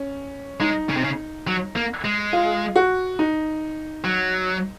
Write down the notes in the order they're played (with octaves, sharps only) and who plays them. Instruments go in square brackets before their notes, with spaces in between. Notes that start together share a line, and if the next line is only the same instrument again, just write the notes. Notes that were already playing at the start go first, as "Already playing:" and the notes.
Already playing: [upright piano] C#4
[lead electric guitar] G#3 [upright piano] D#4
[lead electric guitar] C#3
C3
C#3
F#3
A#3
G#3
[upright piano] F4
F#4
D#4
[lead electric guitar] F#3